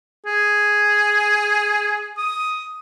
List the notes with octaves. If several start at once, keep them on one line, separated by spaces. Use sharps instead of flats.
G#4
D#6